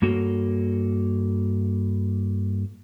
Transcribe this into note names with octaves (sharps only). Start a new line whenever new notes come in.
G2 A#3 F#4 A4 C#5